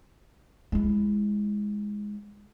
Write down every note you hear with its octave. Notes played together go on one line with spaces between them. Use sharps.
G#3 E4